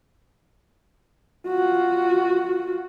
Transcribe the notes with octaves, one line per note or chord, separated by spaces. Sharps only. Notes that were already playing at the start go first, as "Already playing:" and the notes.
F4 F#4